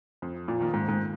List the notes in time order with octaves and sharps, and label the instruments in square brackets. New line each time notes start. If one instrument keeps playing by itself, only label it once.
[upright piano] F2
[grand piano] A#2
[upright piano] D#3 A#3 F4
[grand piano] G#2
G#2